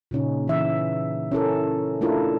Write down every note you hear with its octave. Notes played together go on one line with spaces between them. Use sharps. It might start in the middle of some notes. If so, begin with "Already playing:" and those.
A#2 C#3 C#4 D#4
E3 E5
C#4 E4 A4 A#4
A3 D4 E4 F4 A4 A#4